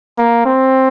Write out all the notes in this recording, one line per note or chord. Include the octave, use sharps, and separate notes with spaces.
A#3
C4